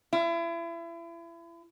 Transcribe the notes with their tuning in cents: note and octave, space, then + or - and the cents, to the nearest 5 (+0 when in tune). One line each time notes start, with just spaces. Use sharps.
E4 +35